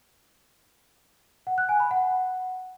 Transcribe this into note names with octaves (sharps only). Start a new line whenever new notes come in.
F#5
F#6
G#5
B5
F#5